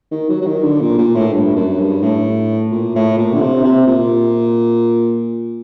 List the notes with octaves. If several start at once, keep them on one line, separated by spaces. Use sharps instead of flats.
D#3
F#3
F#3
D#3
D3
A#2
A#2
A2
G2
F#2
G2
A2
A#2
A2
A#2
D3
C3
C3
A#2